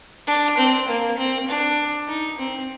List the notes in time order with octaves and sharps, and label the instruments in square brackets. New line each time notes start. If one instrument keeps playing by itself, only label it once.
[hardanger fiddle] D4
C4
A#3
C4
D4
D#4
C4